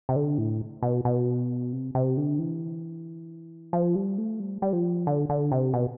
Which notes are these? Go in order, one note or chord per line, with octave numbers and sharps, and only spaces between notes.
C3
D3
A2
B2
B2
C3
C3
D3
E3
F3
G3
A3
G3
G3
F3
D3
D3
C3
B2